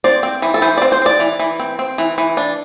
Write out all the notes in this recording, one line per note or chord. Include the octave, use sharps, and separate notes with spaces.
C4 D5
C4
E3
A4
E3 C5
D5
C4
C5
C4 D5
E3
E3
C4
C4
E3
E3
D4